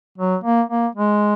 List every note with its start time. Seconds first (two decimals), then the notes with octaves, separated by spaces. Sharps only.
0.18 F#3
0.44 A#3
0.69 A#3
0.95 G#3